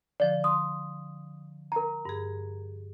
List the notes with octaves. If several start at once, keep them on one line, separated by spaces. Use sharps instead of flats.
D3 F3 D5
C6 D#6
A#4 A#5
G2 G#4